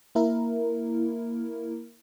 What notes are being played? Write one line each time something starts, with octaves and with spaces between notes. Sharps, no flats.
A#3 E4 A#4